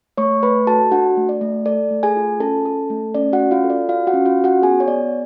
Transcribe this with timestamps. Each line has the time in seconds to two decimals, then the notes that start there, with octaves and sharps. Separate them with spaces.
0.17 A3 C#5 C#6
0.43 A3 B4 B5
0.67 F#4 A4 A5
0.91 D4 F#4 F#5
1.17 A3
1.29 D5
1.41 A3
1.66 A4 D5
1.91 A3
2.03 G#4 G#5
2.16 F4
2.40 C#4 A4 A5
2.65 A4
2.90 A3
3.14 C#4 D5
3.33 F#4 F#5
3.39 C#4
3.51 F4 F5
3.64 A4
3.70 D5
3.89 F4 F#4 F5
4.07 F#4 F#5
4.13 C#4
4.25 F4 F5
4.38 C#4
4.44 F#4 F#5
4.62 B3 G#4 G#5
4.80 C#5
4.87 B3 D5